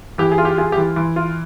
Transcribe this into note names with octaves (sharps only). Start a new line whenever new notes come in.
E3 G4
G#4
F4
G4
F4 G#4
G4
E3
E3
F4